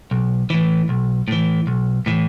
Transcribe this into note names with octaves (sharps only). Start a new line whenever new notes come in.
B1
A2 E3
B1
A2 E3
B1
A2 E3